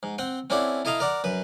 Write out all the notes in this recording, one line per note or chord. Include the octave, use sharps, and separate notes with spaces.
G#2
C4 F#5 G5
C4 C#4 E4 A4 D5 F#5
E4 A4 D#5 F5 A#5
A#4 D5 F#5
F#2 B4